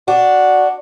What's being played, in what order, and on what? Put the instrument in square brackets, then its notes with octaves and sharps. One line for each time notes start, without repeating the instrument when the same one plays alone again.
[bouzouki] D4 [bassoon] F#4